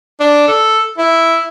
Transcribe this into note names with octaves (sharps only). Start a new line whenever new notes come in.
D4
A4
E4